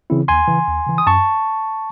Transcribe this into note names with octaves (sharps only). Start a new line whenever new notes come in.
C#3 E3 C4 E4
D#2 G#5 C6
C#3 E3
D#2
C#3 E3
D#6
F#2 A5 C#6